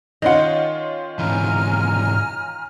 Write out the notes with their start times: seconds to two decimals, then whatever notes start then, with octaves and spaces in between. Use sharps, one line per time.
0.22 D#3 C#4 F4 D#5 F#5
1.19 G#2 C3 E3 G#5 A#5 F6